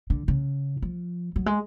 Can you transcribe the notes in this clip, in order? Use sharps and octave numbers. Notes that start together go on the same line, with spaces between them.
D3
C#3
F3
F#3
G#3